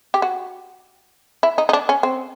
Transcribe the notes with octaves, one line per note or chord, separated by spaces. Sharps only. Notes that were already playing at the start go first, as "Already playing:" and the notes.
G4
F#4
E4
D#4
D#4
D4
C#4
C4